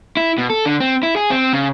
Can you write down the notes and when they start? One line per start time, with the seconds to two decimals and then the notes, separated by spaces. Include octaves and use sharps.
0.17 E4
0.38 B2
0.50 A4
0.65 D3
0.80 C4
1.03 E4
1.16 G#4
1.30 C4
1.53 C#3